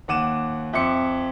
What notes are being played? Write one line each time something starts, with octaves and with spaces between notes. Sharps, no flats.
D#2 F#5 D6 D#7 E7
F2 E5 C6 D6 C#7